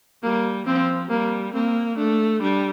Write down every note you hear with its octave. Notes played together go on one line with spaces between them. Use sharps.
G3 A#3
F3 C4
G3 A#3
A#3 C4
A3 D4
G3 D4